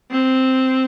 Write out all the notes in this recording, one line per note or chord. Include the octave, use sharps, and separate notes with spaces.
C4